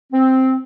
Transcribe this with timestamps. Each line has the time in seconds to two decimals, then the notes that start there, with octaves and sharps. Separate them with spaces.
0.13 C4